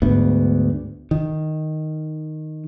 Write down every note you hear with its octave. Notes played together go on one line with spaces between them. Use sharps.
D2 G#2 B3
D#3